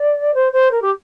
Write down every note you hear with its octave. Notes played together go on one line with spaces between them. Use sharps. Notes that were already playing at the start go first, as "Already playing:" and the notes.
Already playing: D5
C5
C5
A#4
G4